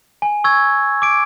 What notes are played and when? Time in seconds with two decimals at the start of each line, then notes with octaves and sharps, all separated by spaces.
0.22 G#5
0.44 C#6 E6 G#6
1.02 D6 D7